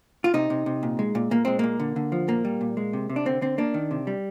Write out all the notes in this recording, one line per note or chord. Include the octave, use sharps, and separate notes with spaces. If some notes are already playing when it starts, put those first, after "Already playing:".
F4
C3 D#4
C3
C3
A#2
G#3
A#2
A#2 A#3
G#3 C4
A#2 A#3
D3
D3
F3
A#2 A#3
G3
A#2
G#3
C3
C3
D4
D3 C4
D3 C4
A#3 D4
D#3
C3
G3